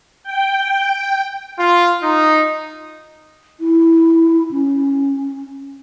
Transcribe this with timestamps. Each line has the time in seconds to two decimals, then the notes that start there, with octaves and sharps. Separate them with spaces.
0.23 G5
1.59 F4
2.02 D#4
3.60 E4
4.51 C#4